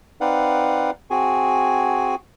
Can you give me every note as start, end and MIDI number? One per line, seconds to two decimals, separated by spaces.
0.21 0.91 60
0.21 0.91 63
0.21 0.91 71
0.21 0.91 74
0.21 0.91 77
0.21 0.91 78
1.10 2.15 60
1.10 2.15 66
1.10 2.15 68
1.10 2.15 80